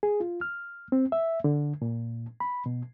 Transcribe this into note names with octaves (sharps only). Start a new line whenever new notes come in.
G#4
F4
F6
C4
E5
D3
A#2
B5
B2